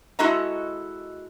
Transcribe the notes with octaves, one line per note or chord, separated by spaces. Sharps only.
G#3 E4 F#4 A4 D#5 A#5